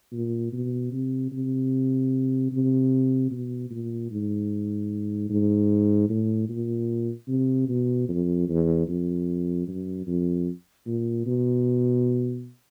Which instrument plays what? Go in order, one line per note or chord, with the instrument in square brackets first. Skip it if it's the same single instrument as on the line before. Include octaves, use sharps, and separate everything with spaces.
[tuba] A#2
B2
C3
C3
C3
B2
A#2
G#2
G#2
A2
A#2
C3
B2
F2
E2
F2
F#2
F2
A#2
B2